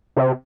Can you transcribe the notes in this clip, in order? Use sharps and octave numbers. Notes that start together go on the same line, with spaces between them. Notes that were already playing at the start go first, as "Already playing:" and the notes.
C3